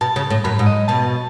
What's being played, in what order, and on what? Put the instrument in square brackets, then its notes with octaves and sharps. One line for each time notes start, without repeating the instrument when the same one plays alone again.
[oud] B2 [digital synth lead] A5
[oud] C#3
A2
[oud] F#2 [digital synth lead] B5
[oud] G#2
[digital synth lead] D#5
[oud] B2 [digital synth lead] A5